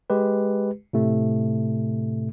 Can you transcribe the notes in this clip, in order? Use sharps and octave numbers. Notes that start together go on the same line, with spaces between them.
G#3 G4 B4
A2 C3 A3